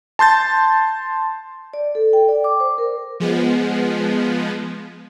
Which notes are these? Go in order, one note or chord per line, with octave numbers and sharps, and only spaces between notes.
A5 C6 G6 A6
D5
A4
G5
D5
D6
C5
A#4
F3 G#3 B3